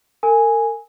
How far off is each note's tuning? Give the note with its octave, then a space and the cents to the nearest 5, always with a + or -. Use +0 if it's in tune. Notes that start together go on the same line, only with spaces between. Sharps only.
A#4 -40 G#5 +0